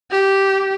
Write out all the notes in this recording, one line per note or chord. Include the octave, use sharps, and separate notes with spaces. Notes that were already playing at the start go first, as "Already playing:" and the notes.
G4